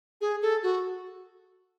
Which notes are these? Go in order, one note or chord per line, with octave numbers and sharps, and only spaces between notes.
G#4
A4
F#4